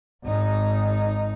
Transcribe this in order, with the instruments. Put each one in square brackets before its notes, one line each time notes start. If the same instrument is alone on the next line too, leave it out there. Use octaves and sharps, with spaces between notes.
[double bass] G#1 D#4